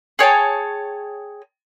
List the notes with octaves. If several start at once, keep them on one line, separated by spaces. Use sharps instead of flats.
G#4 C#5 G5 A5